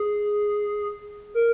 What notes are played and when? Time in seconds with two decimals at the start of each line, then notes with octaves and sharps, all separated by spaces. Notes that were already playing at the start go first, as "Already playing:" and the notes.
Already playing: G#4
1.34 A#4